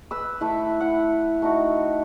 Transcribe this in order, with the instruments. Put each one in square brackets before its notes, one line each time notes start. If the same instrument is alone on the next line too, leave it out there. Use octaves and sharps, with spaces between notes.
[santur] B4 E6
A3 E4
E4 F#5
A3 D#4 F#4